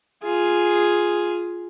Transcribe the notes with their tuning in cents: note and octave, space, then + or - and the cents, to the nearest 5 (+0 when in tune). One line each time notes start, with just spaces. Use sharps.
F4 +0 G#4 +0